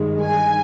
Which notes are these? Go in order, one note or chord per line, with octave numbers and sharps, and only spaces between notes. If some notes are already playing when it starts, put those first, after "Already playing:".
Already playing: G2 D#3 G#3
G#5